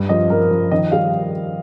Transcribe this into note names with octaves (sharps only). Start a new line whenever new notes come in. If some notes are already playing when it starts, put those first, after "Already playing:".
Already playing: G2
F3 D#5
F3 A#4
F3
D#3 D#5
G3 F5